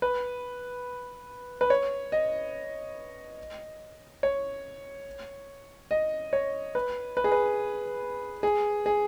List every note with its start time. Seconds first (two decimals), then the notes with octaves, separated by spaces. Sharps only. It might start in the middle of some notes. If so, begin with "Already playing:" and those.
0.02 B4
1.61 B4
1.70 C#5
2.12 D#5
4.23 C#5
5.91 D#5
6.33 C#5
6.75 B4
7.17 B4
7.24 G#4
7.32 B4
8.43 G#4
8.86 G#4